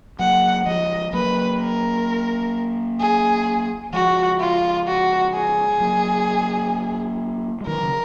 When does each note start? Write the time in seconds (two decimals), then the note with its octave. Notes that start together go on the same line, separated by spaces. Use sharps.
0.19 F#3 A#3 F#5
0.66 F3 G#3 D#5
1.13 F#3 A#3 B4
1.60 A#4
3.00 G#4
3.93 F3 G#3 F#4
4.40 F4
4.87 F#4
5.34 G#4
5.80 F#3 A#3
7.61 G#3
7.67 D#3 F#3 A#4
7.83 C#3